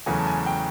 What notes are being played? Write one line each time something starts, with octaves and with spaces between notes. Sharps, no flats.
E2 C#3 F#3 A3 G#5
A5
G#5
A5
G5